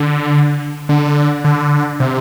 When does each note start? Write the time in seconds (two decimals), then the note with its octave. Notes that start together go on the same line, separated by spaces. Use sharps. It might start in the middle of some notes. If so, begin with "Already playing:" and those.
Already playing: D3
0.89 D3
1.45 D3
2.00 C3